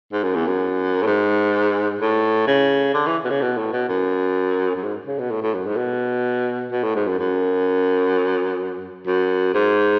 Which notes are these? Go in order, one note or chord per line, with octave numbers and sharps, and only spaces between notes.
G#2
F#2
E2
F#2
A2
G#2
A2
C#3
D3
E3
B2
C#3
B2
A2
B2
F#2
F#2
G#2
C#3
B2
A2
A2
F#2
G#2
B2
B2
A2
G#2
F#2
F#2
F#2
G#2